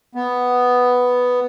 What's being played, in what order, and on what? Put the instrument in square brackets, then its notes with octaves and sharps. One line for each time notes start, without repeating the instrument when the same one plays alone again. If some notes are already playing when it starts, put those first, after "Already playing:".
[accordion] B3